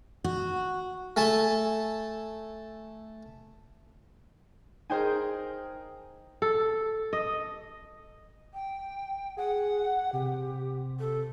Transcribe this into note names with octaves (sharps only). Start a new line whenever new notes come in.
F#4
A3 A4 G#5 A5
D#4 G#4 A#4 C5 G5 G#5
A4
D#5
G5
G#4 F#5
C3 G4
A4